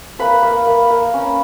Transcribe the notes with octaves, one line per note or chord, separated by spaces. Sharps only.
A#3 B4 B5
A#3
A#3
A#3
C#4